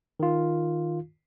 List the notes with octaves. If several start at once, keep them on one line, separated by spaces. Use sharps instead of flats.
D#3 F4